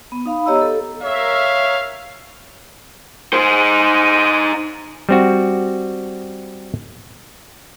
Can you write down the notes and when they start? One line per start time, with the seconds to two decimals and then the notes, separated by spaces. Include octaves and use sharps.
0.12 B3
0.26 D#4 F5 B5
0.46 B3 G4 C#5 D#5 A#5 E6
0.61 A4
1.03 A#4 C#5 E5 F5
3.33 D#4 C5
5.09 G3 C4 F#4